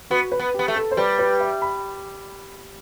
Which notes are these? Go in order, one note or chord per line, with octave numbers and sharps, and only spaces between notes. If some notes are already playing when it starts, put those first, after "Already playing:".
B3 F#4
B4
B3
B3 G4
A3
A4
C5
G3 B4
B4
E5
B5